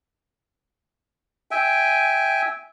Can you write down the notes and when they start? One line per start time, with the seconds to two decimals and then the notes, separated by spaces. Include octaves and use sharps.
1.51 E5 G5 G#5